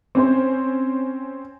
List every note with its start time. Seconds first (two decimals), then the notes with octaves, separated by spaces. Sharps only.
0.15 C4 C#4 C5